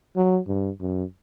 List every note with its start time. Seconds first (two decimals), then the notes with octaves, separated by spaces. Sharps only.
0.16 F#3
0.47 G2
0.81 F#2